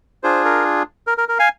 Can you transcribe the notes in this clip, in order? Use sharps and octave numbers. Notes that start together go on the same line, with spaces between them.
D4 F4 G#4 C5
A#4
A#4
A#4
A#4
F5 G#5